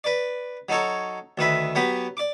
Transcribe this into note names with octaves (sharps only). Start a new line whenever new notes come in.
B4 D5
F#3 D#4 A4 C#5
D2 D#3 B4 E5
F#3 B3 G4 B4
D5 D6